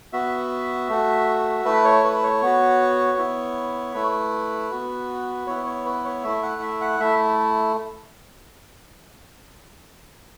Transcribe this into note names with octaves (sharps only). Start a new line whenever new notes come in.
B3 F#4 E5
A3 F#4
A3 E4 B4
C#5
B4
C#5
B3 F#4
B3 E4
A3 E4 B4
B3 F#4
B3 E4 C#5
C#5
B4
C#5
A3 E4 E5
F#5
E5
F#5
A3 E4 E5